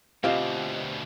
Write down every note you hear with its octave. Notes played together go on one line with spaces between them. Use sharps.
D2 B2 C4 F4 G4 D#5 F5